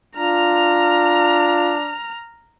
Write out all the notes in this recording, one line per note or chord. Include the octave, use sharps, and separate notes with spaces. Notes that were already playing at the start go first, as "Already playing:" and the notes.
D4 F4 A#5 F6